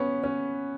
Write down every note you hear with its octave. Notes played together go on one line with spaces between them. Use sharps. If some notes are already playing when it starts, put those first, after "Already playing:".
Already playing: B3 C#4
C#4